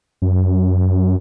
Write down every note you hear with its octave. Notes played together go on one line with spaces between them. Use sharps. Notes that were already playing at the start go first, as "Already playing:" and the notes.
F#2